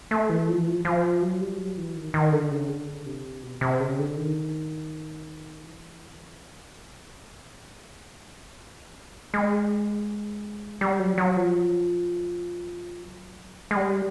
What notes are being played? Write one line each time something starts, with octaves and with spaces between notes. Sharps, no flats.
A3
E3
F3
E3
F3
F3
F#3
G3
F#3
E3
D#3
D#3
D3
C#3
D3
C3
B2
C3
C#3
D3
D#3
E3
F3
F#3
G3
F#3
G3
G#3
G3
F#3
F#3
F3
F#3
G#3
G3